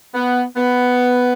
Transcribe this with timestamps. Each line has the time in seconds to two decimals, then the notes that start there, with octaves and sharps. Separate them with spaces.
0.14 B3
0.56 B3